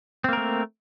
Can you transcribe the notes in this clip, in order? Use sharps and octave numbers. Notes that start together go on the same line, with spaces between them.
A3 A#3 C4 A#4